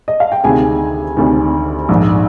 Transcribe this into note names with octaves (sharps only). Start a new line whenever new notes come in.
D#5
F5
G5
D2 C3 D#3 G#4 G#5
D2 C3 D#3
A#1 G#2 D#3